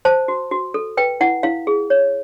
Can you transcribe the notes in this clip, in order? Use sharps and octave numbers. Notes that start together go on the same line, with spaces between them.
C5 A5
F#4
F#4
A4
B4 G5
E4 F#5
E4 F5
G#4
C#5